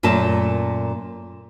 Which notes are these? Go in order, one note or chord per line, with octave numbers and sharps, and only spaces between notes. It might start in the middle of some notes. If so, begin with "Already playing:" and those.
F#2 A#2 A3 A#4 A5